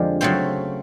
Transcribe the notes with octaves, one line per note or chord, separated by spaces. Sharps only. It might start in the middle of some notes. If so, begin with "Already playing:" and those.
Already playing: F2 D3 F3 G#3 G4
C#3 F#3 A3 C4 C5